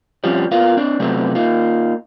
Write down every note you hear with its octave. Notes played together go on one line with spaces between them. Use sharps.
F2 F3 G3 C#4
B3 F4 A#4 F5
C4 D4
C3 F#3 A3 B3 C4
A#3 D#4 F4